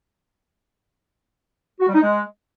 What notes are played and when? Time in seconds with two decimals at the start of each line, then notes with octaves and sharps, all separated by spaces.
1.80 F#4
1.87 G3
1.95 D#4
2.02 G#3